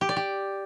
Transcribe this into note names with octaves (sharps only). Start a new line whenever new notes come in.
G4
D5
G4